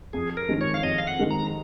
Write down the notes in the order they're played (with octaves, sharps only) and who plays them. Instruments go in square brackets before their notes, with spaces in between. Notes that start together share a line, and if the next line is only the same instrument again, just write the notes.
[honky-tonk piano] F2 [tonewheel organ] G#4
[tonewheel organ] A#4
[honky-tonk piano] D#3 G#3
[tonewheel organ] C#5
F5
[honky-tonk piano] F2 [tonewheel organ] D#5
[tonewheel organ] F5
F#5
[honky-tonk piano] D#3 G#3
[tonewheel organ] A#5